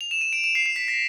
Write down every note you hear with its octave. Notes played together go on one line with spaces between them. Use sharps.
F7
E7
D#7
D7
E7
C7
C7
B6
A#6